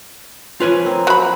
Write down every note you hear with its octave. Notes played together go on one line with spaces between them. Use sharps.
F3 C#4 F4 B4 G#5
A#3 C4
F#3 B5